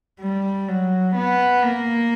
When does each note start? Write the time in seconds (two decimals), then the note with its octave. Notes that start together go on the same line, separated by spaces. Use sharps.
0.20 G3
0.68 F#3
1.16 B3
1.64 A#3